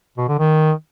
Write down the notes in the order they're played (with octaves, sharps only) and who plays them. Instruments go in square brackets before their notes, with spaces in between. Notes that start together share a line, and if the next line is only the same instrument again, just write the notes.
[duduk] B2
D3
D#3